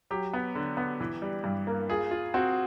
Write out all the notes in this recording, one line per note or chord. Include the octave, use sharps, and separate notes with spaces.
F#3 G4
B3
D3
B3
E3
G3
G2
A#3
F4 G#4
F4
C4 F#4